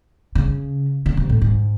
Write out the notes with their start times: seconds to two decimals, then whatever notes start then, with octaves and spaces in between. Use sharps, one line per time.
0.35 C#3
1.06 C#3
1.17 C3
1.29 A2
1.41 G#2